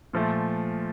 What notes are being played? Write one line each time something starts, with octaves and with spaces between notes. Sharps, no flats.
A#2 F3 A3